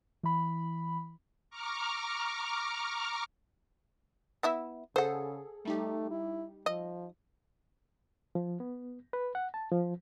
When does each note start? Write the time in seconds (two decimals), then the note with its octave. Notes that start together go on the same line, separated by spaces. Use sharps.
0.23 E3 B5
1.50 A#5 C#6 D6 F6
4.43 B3 E4 E5
4.96 C#3 G#4 A4 C5 F#5
5.65 G3 A3 D#4 G4
6.10 E4
6.66 F3 D#5
8.35 F3
8.60 B3
9.13 B4
9.35 F#5
9.54 A5
9.72 F3